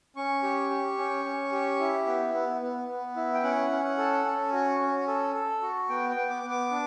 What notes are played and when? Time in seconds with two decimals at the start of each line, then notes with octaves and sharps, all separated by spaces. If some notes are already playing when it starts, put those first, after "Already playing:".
0.16 C#4 C#6
0.43 G4
0.70 G4
0.98 C#4
1.25 C#4
1.52 G4
1.80 E4
2.07 B3
2.34 B3
2.61 B3
2.89 B3
3.16 E4
3.34 G5
3.43 C#4 F#5
3.71 C#4
3.84 F#5
3.98 A4
4.25 C#4
4.53 F#4
4.80 C#4
5.08 A4
5.34 A4
5.62 F#4
5.89 B3 G5
6.10 G5
6.16 B3
6.30 D6
6.43 B3
6.50 D6
6.71 D4